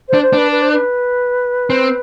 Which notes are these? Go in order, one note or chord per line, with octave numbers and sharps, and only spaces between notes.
C5
D4
C5
D4 B4
B4
C5
B4
C4